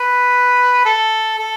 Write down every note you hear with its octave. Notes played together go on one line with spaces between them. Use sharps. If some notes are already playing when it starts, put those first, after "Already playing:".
Already playing: B4
A4
A4